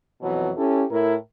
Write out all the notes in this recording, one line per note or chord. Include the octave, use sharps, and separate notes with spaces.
F2 B2 E3 F#3
C#4 E4 G4 A4
A2 E4 A#4